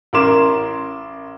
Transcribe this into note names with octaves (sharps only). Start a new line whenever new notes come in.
A1 A#4 C6 D6 E7